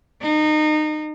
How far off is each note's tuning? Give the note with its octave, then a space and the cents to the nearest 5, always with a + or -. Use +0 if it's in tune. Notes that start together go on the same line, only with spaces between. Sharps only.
D#4 -25